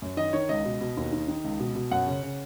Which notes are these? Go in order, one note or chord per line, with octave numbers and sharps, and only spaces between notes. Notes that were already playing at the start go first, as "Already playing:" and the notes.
F#2
D#3 D#5
D#3 C#5
C#2 D#5
B2
B2
D#2
D#3
D#3
C#2
B2
B2
F#2 F#5
C#3
C#3